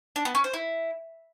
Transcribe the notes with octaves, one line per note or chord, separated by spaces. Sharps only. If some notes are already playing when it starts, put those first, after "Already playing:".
D4
B3
C#4
C5
E4